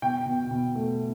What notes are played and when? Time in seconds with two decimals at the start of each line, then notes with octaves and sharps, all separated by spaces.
0.02 B2 G5
0.26 B2
0.51 B2
0.75 A3